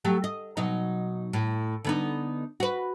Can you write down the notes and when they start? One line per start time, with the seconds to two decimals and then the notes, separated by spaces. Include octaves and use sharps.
0.05 F#3 A3 G4
0.24 D#5
0.57 B2 F#3 D#4
1.33 A2
1.85 D3 B3 D#4
2.60 F#4 B4